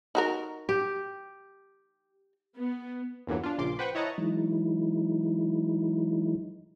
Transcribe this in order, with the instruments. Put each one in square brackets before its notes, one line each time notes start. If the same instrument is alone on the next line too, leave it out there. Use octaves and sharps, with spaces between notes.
[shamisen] D#4 F#4 A#4
[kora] G4
[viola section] B3
[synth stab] E2 G2 A#2 D3 E3 F#3
D4 F4
A#1 A#2 C#3 C6 D6
B4 C5 F#5 G5 B5 C#6
E4 C#5 D#5 F#5 A5 A#5
[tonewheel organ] E3 F#3 G#3 D#4 E4